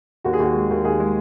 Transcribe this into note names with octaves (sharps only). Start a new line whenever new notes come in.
D#2 F#4
G#4
D#2 F#4
G#3
D#2
D#2 G#4
G#3